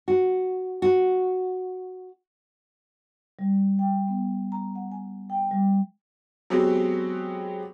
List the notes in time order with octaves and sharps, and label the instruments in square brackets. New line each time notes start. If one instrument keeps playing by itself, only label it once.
[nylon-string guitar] F#4
F#4
[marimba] G3
G5
B3
A#5
F#5
G#5
G5
G3
[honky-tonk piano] F#3 G#3 B3 C4 F#4 G4